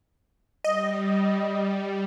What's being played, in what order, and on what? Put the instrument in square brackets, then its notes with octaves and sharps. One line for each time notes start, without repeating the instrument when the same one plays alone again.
[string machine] G3 [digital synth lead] D#5